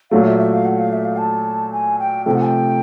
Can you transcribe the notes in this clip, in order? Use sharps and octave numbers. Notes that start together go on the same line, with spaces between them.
A#2 F#3 A3 F5
E5
E5
F5
F#5
F5
E5
F5
A5
G#5
G5
C3 F3 A3 G5
F#5
G#5
G5